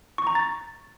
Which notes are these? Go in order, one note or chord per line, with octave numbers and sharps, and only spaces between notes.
C#6
A#5
A6